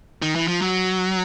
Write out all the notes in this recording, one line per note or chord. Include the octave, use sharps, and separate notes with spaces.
D#3
E3
F3
F#3